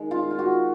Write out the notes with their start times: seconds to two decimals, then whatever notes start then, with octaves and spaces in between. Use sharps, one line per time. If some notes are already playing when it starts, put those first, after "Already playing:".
Already playing: D#3 G#3 D#4
0.11 F4
0.31 F4
0.39 F#4